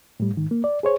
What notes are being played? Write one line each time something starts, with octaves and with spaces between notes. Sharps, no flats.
A2 G3
G#2 D#3
A#3
D5
G#4 C5 C#5